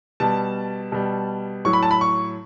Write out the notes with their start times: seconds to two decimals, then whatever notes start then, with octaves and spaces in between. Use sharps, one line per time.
0.20 B2 G3 A5
0.92 B2 G3
1.65 A2 F#3 C#6
1.73 B5
1.83 A5
1.91 B5
2.01 C#6